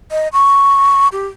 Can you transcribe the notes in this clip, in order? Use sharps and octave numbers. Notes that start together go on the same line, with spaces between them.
D#5
C#6
G4